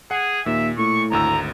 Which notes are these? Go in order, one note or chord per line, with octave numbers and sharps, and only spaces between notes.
G#4 F#5
D#2 A#2 E5
A2 C#6
G#1 D2 A#5 E6